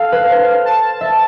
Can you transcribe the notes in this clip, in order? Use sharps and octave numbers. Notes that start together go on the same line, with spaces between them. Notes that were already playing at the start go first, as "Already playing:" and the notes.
Already playing: A4 F5
B4
C5
A5
E5